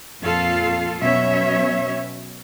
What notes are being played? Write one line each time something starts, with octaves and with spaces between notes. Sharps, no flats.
F2 A#2 F4 A4 F5
B2 F#3 C#4 C#5 E5